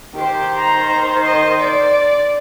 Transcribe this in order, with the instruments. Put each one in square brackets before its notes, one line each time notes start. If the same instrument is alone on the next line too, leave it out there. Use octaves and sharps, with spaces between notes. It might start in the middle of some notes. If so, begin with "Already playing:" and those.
[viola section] D#3 C5 [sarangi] G4
[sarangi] A#5
D#5
D5